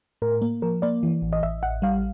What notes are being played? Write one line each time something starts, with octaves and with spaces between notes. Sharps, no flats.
A2 A#4
A#3
F3 A#4
A#3 D5
E3
A1
D#5
A1 E5
A1 F#5
G3 F5